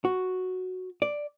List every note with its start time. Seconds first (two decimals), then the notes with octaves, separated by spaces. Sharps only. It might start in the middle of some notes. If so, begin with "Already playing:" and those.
0.05 F#4
1.02 D5